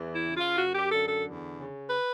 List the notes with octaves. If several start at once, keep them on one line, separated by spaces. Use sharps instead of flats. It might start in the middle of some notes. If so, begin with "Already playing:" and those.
Already playing: E2 E3
E4
C#3
F4
F#2 F#4
G4
D3 A4
A4
E2
C#3
B4